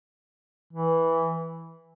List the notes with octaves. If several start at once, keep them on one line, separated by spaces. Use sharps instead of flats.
E3